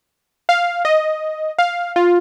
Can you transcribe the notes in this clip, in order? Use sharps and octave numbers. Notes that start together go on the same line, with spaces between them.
F5
D#5
F5
F4